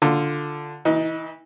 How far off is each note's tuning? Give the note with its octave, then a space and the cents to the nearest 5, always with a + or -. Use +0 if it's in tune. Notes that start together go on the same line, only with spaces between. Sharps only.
D3 +0 F4 +0
E3 -20 D#4 +15